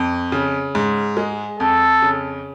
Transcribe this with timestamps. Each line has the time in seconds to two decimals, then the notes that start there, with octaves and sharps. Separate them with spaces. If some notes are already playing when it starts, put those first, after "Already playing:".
Already playing: F2
0.32 C#3
0.75 G#2
1.17 G#3
1.60 F2 A4
2.02 C#3